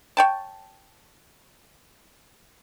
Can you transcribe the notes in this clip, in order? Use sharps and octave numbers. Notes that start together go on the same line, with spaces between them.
C#5 G5 A5